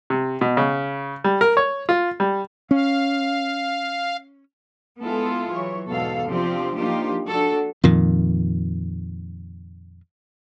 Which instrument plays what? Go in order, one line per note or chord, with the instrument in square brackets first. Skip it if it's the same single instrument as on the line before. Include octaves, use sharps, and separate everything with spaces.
[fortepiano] C3
B2
C#3
G3
A#4
C#5
F4
G3
[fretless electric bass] C#4 [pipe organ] F5
[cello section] G#3 B3 E4 F4 G#4 A4
E3 F#3 C#5
E2 G#2 B2 A4 F5
C3 F3 C4 D4 F4 G4
F3 A#3 D4 D#4 F4 G4
D4 F#4 A4
[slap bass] F2 A#2 D#3